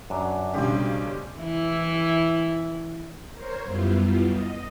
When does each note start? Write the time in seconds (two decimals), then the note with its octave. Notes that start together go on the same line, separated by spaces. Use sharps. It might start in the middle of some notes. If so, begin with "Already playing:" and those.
0.10 F#2 F#3 D4
0.54 B1 G2 C#3 A3 G4 C5
1.39 E3 E4
3.32 A#4 C5 C#5
3.65 F#2 G3 B3 E4 F4
4.31 D#5